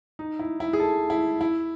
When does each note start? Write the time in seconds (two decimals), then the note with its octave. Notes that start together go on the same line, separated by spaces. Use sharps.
0.19 D#4
0.39 E4
0.60 E4
0.73 G#4
0.80 A4
1.10 E4
1.41 E4